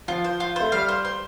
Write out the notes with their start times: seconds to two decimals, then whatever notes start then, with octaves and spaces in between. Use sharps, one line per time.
0.08 F3 F4
0.24 C5
0.40 F4
0.56 A3 C5
0.72 G3 F5
0.88 C5
1.05 C5